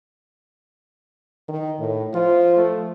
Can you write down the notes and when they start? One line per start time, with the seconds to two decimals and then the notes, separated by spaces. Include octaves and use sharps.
1.48 D#3
1.79 A2
2.14 F3 F4
2.56 A3